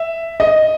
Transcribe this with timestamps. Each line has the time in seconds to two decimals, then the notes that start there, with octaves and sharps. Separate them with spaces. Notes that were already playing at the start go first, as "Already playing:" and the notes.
Already playing: E5
0.40 D#5